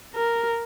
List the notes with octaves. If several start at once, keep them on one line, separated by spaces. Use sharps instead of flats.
A#4